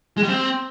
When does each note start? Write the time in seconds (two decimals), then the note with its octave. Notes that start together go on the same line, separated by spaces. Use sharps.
0.17 G#3
0.23 G3
0.29 C4